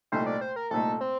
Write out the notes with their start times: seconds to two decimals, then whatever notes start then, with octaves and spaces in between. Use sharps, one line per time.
0.12 C2 A#2 A3 D#4 C5
0.26 D5
0.41 C5
0.56 A#4
0.71 C2 A#2 A3 D#4 A4
1.01 C4